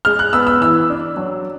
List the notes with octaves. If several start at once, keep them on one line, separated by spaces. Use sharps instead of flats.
G#3 F6
F#6
B3 E6
E6
E3 E6
D4
F#3